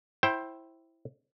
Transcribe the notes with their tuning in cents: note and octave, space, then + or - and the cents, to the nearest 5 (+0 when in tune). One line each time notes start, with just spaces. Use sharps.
E4 +0 C5 +15 G5 -10